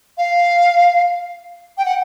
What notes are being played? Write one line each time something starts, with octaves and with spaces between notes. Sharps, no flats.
F5
G5
F#5